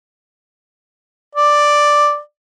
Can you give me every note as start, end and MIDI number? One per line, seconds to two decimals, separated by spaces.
1.35 2.19 74